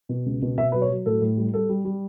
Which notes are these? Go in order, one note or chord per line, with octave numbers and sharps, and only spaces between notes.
B2
C#2
B2
B2 E5
F#3 B4
C#5
F#3
A2 A4
A2
G3
G3 A4
G3
G3